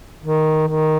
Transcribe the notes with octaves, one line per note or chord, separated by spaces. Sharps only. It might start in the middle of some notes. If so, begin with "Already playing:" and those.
D#3
D#3